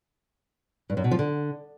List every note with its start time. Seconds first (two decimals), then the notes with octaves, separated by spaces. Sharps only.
0.90 G2
0.97 F#2
1.04 B2
1.11 F3
1.19 D3